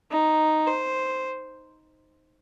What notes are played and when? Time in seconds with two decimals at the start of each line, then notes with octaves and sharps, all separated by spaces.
0.12 D#4
0.67 C5